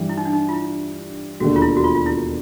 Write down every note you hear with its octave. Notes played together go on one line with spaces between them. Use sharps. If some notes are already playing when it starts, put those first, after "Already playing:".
Already playing: G2 E3 G3
E4
D#4
D4
D#4
F4
E4
E1 D#2 D3 F#4
F4
E4
F#4
F4
F4
E4